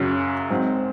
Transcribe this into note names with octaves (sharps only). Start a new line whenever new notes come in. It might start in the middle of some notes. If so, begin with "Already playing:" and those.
Already playing: F#2 C#3 F#3 C#4
G#2 F#3 C4